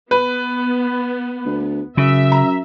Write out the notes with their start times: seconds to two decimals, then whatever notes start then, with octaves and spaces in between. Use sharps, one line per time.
0.11 B3 B4
1.46 D2
1.97 F#2 C#3 E5
2.32 A#5